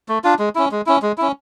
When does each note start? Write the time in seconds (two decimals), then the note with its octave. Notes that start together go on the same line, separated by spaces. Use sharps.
0.09 A3
0.24 D4 F4
0.39 G#3
0.55 C#4 E4
0.71 G#3
0.86 C#4 E4
1.02 G#3
1.18 C#4 E4